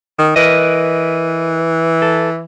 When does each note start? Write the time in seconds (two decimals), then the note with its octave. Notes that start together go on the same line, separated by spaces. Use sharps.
0.19 D#3
0.36 E3 A#4 B4 D#5
2.02 A4